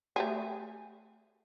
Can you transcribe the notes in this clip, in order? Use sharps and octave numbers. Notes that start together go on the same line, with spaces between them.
A3 G4 G#4